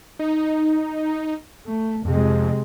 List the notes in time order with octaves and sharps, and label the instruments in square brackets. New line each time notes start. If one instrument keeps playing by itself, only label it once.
[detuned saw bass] D#4
[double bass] A3
[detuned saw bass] F2 [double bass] C3 G#3